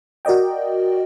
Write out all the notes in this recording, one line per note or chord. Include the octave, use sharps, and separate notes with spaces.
F#4 A#4 D5 D#5 G5